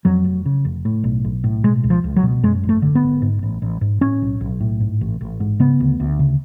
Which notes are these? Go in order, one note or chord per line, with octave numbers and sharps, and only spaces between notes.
F2 F#3
F1
C#3
F1
A2
B1
B1
A2
B2 G#3
C#2
F3
C#2
F#3
B2
F#2 G#3
G#1
A3
D3
B3
G#1
G#2
A1
A1
G#2
A2 C#4
B1
B1
A2
G#2
A1
A1
G#2
C#3 B3
D2
D2
C#3